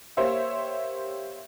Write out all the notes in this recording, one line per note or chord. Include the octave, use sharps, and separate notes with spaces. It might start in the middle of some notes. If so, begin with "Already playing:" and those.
A#3 G4 C5 C#5 E5